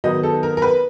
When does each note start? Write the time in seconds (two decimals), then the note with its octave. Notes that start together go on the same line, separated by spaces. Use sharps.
0.04 D#3 F#3 B3 D#4 D#5
0.23 A4
0.43 A#4
0.57 A#4
0.62 B4